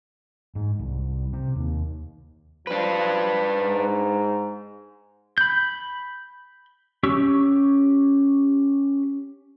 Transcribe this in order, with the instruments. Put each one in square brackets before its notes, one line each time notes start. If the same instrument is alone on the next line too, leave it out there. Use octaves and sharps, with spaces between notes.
[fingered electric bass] G#2
C2
C3
D#2
[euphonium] F3 [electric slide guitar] D4 B4
[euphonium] G#2
[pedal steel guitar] B5 G6
C#4 G4 C#6 E6